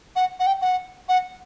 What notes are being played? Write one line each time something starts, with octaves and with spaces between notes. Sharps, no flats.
F#5
F#5
G5
F#5
F#5